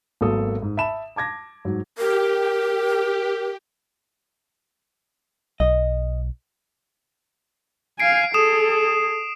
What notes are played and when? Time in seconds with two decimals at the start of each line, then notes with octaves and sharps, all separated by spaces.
0.21 G#1 F#3 A#3 B3 A4 D#6
0.62 G#2
0.77 E5 A5 B5 E7
1.16 A5 D6 G#6 A#6
1.65 G#2 F#3
1.98 G4 A#4
5.60 B1 D#5
8.00 F5 G#5 C7 D7
8.34 G#4 A4 D#6 E7